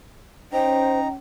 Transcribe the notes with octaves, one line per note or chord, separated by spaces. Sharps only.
C#4 D#4 C5 G5 A#5